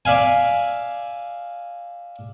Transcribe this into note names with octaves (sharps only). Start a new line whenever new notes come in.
D5 E5 F5 G#5